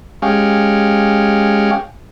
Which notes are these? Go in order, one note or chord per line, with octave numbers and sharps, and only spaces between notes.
G#3 C#4 G4 F5